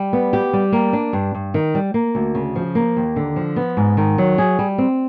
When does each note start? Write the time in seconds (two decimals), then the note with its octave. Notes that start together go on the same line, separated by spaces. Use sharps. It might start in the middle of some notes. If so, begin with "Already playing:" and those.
Already playing: G3
0.13 B3
0.33 G4
0.53 G3
0.73 A#3
0.93 D4
1.13 G2
1.35 G2
1.54 D#3
1.75 G3
1.94 A#3
2.15 D2
2.35 C#3
2.56 F3
2.75 A#3
2.97 D#2
3.16 D3
3.36 F3
3.56 B3
3.77 G#2
3.97 D#3
4.18 F#3
4.38 G#4
4.59 G3
4.78 C4